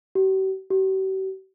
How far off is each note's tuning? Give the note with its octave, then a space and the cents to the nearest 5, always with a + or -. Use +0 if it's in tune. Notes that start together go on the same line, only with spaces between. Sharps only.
G4 -45
G4 -45